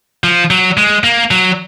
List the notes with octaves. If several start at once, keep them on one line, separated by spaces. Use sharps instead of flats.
F3
F#3
G#3
A#3
F#3